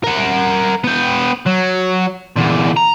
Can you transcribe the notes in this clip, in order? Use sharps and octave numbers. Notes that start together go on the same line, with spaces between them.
A#4 F#5
B3 G5
F#3
E2 A#2
A#5